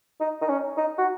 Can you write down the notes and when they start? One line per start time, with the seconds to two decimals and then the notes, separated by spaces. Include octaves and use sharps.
0.20 D#4
0.42 D#4
0.49 C#4
0.77 D#4
0.98 F#4